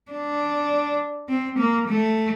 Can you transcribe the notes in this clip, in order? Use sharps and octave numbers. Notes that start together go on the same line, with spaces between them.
D4
C4
A#3
A3